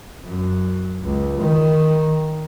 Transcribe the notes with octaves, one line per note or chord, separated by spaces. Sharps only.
F#2
C#2
D#3